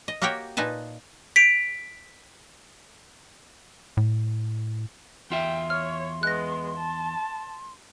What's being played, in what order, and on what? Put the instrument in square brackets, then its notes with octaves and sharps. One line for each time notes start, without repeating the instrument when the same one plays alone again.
[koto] D#5
A#3 F#4 G4 A#4 C#5 G5
A#2 D#4 B4 G#5 A5
[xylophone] B6 D7 F7
[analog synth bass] A2
[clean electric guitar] E2 F4 E5 [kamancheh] G5 [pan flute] C6
[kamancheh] C#5 [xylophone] F6
[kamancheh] G#3 B3 [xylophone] F#6 A#6
[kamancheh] A5